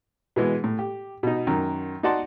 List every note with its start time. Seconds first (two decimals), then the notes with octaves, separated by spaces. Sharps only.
0.36 B2 E3 G#3 B3
0.64 A2
0.79 G4
1.23 B2 D#4
1.47 F#2 D#3
2.03 D#4 F#4 D5 F#5 A5 C6